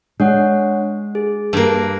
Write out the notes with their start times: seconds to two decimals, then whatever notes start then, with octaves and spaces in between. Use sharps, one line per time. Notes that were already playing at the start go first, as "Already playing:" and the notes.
0.20 G#3 D4 C#5 F#5
1.15 G#4
1.53 G2 A#3